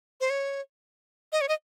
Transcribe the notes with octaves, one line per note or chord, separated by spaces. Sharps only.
C5
C#5
D#5
C#5
D#5